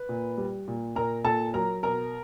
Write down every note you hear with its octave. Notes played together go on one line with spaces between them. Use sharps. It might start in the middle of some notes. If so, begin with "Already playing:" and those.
Already playing: B4
A#2
G3
A#2
A#2 A#4 A#5
A#2 A4 A5
F#3 A#4 A#5
B2 A#4 A#5